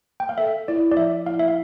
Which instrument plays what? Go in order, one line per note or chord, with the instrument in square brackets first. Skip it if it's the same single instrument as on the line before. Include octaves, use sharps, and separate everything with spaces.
[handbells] G5
F5
[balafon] A4 [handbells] E5
[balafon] E4 [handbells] D5
[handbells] D5
[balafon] F3 [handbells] E5
[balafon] E4 [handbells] F5
[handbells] E5
F5